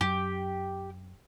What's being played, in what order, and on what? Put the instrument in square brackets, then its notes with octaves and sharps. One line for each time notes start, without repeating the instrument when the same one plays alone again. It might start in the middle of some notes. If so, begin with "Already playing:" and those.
[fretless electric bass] F#2 [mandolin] G4